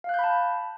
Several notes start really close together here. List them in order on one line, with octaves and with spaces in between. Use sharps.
F5 F#6 G6 B5 A5